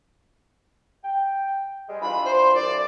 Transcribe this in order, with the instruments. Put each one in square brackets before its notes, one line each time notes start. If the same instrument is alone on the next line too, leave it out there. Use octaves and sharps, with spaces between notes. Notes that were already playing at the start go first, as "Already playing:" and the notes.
[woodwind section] G5
G3 G#3
[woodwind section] E3 D4 F4 [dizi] B5
[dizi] C5
[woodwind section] C2 [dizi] D5